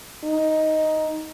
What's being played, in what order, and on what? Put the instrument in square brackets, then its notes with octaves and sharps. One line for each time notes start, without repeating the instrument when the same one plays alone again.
[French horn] D#4